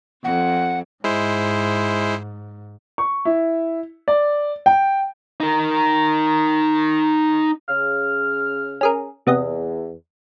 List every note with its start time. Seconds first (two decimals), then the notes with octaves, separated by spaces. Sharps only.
0.24 F2 F#5
1.04 G#2 G#3 E4 C5
2.98 C#6
3.25 E4
4.08 D5
4.66 G5
5.40 D#4 A#4
7.69 C#3 F6
8.81 C#4 G#4 A#4
9.27 E2 C3 B3 D#5